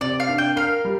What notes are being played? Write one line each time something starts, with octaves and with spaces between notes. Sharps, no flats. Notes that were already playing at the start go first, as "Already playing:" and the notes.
C3 D5
F5
D4
G5
A#4 F5
G3